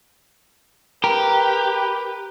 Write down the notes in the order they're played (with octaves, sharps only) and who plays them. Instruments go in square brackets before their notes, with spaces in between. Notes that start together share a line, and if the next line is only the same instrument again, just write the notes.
[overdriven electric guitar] G4 [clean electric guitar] A#4 [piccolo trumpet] B4